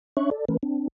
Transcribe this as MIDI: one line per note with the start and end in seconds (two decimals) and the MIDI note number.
0.17 0.30 61
0.17 0.30 62
0.17 0.30 73
0.17 0.30 76
0.17 0.30 85
0.17 0.30 90
0.31 0.45 69
0.31 0.45 74
0.49 0.57 52
0.49 0.57 57
0.49 0.57 61
0.49 0.57 70
0.49 0.57 71
0.63 0.88 60
0.63 0.88 62